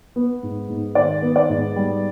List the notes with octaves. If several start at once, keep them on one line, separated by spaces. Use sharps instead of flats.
B3
G#2
G#2
D#3 D5
B3
D5
G#2
G3